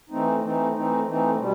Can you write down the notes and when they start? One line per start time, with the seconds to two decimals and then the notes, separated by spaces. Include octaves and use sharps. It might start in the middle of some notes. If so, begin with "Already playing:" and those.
0.10 E3 A3 C4 D#4
0.42 E3 A3 C4 D#4
0.75 E3 A3 C4 D#4
1.05 E3 A3 C4 D#4
1.38 B2 G3